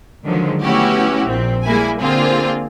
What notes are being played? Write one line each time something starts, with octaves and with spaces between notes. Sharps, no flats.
D3 D#3 F3 F#3 G#3
A3 B3 C#4 E4 F#4 G4
A#1 A#2 C4
G3 G#3 A#3 E4 G#5
D3 A#3 C4 F4 G#4